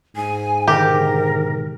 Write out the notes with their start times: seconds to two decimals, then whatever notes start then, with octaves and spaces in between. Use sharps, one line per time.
0.16 G#2 G#5
0.68 B2 D3 D#3 G4 A#4